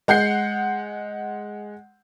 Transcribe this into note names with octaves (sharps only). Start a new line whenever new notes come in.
G#3 F#5 G6 C7